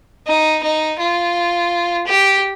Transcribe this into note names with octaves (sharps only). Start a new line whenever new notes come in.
D#4
D#4
F4
G4